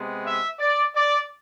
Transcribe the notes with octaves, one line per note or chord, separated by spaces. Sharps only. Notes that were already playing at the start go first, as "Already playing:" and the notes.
Already playing: C3 G#3 B3
E5
D5
D5